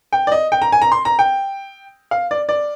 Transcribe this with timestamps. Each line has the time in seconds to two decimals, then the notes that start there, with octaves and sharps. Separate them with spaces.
0.13 G5
0.27 D5
0.32 D#5
0.52 G5
0.62 A#5
0.72 G#5
0.82 A#5
0.92 C6
1.05 A#5
1.19 G5
2.11 F5
2.31 D5
2.49 D5